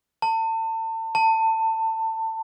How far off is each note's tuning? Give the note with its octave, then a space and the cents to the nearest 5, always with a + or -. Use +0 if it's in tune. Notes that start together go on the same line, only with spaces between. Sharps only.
A5 +35
A5 +25